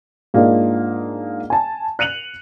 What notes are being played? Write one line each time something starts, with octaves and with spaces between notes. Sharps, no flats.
G#2 A#3 D4 F4 G#4 D#5
G#5 A5
F#6 C#7 D#7 F7 F#7